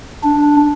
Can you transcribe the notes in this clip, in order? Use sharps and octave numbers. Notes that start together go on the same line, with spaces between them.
D4